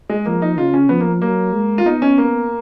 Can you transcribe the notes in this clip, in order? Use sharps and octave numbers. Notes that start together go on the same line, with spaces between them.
G#3
F3 A#3
D#4
C#3 F4
C#4
F3 B3
A#3
F#3 A#3
G#3
F4
B3 D#4
C#4
A#3